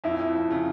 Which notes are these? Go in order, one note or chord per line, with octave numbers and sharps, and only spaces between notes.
F2 E4
F2
F2
C#3